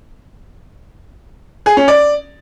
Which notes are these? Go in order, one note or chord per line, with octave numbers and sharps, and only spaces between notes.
G#4
C#4
D5